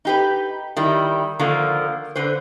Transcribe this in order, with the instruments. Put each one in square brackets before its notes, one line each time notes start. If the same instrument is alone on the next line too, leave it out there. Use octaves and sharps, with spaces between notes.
[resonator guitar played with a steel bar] D#4 G4 B4
D#3 G3 E4
D3 D#3 F3 A#3 F4 A#4
D3 B4 C5